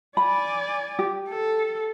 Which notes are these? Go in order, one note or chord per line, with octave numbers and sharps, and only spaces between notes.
D5 G#5 B5
G4
A4